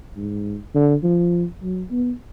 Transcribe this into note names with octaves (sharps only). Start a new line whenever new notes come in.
G#2
D3
F3
F#3
B3